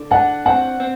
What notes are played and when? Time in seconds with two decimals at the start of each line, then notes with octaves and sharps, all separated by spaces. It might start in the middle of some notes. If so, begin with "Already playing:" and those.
Already playing: D3
0.11 D4 F#5
0.46 C4 F#5
0.80 C4